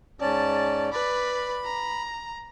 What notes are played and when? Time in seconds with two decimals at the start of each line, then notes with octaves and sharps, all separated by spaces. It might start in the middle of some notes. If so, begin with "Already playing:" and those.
0.21 G#2 C#4 D5 A5
0.92 B4 D5 B5
1.64 A#5